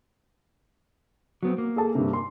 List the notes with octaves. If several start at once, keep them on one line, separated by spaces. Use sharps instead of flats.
F#3 B3 C4 F#4
A#3
G#4 A4 A5
G2 C3
C6